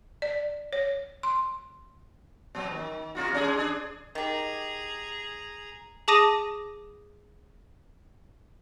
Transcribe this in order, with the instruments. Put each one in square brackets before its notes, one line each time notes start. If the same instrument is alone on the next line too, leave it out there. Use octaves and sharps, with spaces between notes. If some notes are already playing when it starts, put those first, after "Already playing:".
[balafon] D5
C#5
C6
[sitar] A#2 F#3
D#3
B2 F4 F#4
G#2 C#4 G#4
D4 G#4
[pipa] D#3 G4 [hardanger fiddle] G#4 A#5
[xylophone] G#4 A5 D6 D#6 A#6 D#7